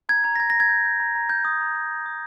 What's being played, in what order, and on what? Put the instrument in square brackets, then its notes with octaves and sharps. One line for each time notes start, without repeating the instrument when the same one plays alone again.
[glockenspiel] A#5 G#6
A#5 G#6
A#6
A#5 G#6
A#6
A#5
G#6
G6
G6
A#5
A#5
A#5 G6
D#6
A#5
D#6
A#5
D#6